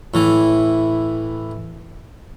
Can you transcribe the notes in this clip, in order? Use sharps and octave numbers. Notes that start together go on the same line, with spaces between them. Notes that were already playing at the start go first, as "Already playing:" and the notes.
A2 E3